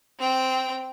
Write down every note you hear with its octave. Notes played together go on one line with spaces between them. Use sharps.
C4 G5